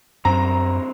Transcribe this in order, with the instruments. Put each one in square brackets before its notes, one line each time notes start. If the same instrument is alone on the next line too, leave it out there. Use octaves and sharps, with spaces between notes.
[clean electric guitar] C2 D3 C4 [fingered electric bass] F#2 F#3 D4 [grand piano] A#5